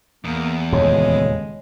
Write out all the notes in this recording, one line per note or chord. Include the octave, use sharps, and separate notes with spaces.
E2 A#3
D#1 F2 C#3 G#3 C#5